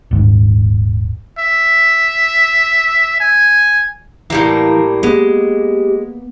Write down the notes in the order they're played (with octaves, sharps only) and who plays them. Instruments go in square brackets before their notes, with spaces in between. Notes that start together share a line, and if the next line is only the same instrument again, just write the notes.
[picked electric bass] D#1 G#1 G#2
[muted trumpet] E5
G#5
[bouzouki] A2 G3 A#3 [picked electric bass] E3
[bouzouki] G#3 [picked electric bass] A#3 B3 [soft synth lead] G4